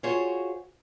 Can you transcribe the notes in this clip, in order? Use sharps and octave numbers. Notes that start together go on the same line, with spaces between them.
F4 F#4 G#4 C5 C#5